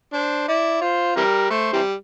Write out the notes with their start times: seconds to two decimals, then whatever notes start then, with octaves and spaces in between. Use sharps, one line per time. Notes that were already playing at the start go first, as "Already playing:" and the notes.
0.13 D4 C5
0.48 E4 D5
0.81 F4 C5
1.16 C3 E3 G3 A#4
1.50 A3 C5
1.73 C3 E3 G3